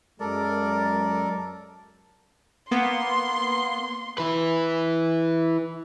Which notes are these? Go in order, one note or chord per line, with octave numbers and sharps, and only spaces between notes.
F#2 F#3 G#3 A4 A#4 D5
A#3 B3 C6
E4 B4